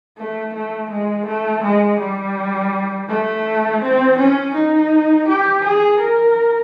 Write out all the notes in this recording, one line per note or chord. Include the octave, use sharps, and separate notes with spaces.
A3
A3
G#3
A3
G#3
G3
A3
C4
C#4
D#4
G4
G#4
A#4